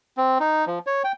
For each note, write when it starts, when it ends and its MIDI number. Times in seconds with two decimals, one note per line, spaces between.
0.17 0.38 60
0.40 0.65 63
0.67 0.79 53
0.87 1.03 73
1.04 1.12 79